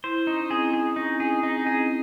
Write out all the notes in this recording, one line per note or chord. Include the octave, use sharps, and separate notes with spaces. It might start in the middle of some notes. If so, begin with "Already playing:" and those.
E4 C5
C#4 D#4
C4 G#4
G#4
C#4 D#4
G#4
C4 D#4
G#4